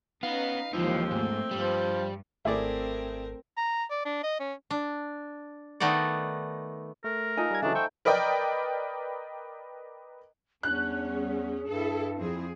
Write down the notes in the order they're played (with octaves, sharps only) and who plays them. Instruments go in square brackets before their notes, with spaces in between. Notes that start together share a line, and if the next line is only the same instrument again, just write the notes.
[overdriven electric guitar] B3 [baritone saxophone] C#4 [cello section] D#4 B4 [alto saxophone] F5
[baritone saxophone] D#2 [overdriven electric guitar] E3 D#4 [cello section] F3 G#3 [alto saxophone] C4
[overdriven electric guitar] G#2 [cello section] A3 A#3
[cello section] G2 [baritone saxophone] F3 [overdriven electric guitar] G3
[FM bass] G#1 [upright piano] A3 [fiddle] C4 A#4 [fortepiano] E4 G#4 D5
[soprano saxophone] A#5
D5
D4
D#5
C#4
[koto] D4
D#3 A3 B3 D#4 D5
[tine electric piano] A3 [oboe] A#4
[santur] D#4 [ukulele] F4 A4 G#5
[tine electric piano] G3 G#6
[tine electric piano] C#3 E3 F#3 [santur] A3 D#4 [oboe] D4
[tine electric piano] C5 C#6 E6 [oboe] G5
[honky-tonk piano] A#4 B4 D5 D#5 G5
[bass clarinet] E2 [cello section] G3 C#4 [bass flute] D4 [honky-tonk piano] F#6
[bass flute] G#4
[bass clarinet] G2 [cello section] E4 A4
[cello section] F2 C4 G#4 [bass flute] E4